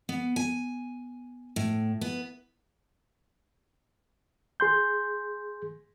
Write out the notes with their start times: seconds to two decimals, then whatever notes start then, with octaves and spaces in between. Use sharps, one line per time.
0.09 B3
0.36 G#5
1.56 A2
2.01 B3
4.60 G#4 C6 G6